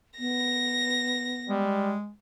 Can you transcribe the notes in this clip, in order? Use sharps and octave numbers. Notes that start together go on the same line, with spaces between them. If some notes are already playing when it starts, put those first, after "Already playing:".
B3 A#6
G3 G#3